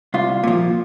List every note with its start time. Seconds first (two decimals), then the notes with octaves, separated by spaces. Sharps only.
0.14 C2 F4
0.44 A#2 F3